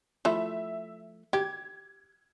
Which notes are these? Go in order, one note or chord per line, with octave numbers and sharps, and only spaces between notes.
F3 A3 E4 E5
G4 G#6